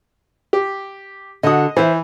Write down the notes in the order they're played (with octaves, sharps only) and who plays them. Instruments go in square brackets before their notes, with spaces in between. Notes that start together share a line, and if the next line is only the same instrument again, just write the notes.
[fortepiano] G4
[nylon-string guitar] D3 F#4 [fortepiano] D#5 D#6
[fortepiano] E3 [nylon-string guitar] C5 E5